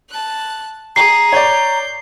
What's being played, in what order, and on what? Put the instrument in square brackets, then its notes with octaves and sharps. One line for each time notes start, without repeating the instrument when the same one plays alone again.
[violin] A5 F#6
[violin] G#4 [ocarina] A#5 [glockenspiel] C7
[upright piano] C#5 D5 [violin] G6